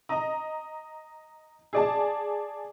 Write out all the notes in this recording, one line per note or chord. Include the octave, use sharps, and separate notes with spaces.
D#5 A#5
G#4 D5 A5